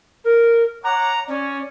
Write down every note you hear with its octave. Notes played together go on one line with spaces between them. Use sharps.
A#4
C#5 F#5 A#5 D6
C#4 D5